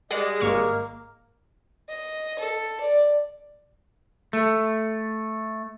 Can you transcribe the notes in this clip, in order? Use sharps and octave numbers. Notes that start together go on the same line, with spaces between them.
G3 G#3 G#4 D5 D#5 F#5
G#1 A#3 C#6 F6
D#5
A4
D5
A3